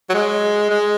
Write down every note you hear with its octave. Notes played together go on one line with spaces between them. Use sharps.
F#3
G#3
G#3